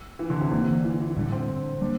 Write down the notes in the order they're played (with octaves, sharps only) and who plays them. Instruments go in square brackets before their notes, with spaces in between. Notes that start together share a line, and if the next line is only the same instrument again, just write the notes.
[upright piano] E3
D3
C3
[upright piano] D3 [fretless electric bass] E3 A#3 D4
[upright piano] E3
E3
[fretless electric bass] A2 G3 D4 [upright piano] D3
[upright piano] C4
[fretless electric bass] G3 A#3 [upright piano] D4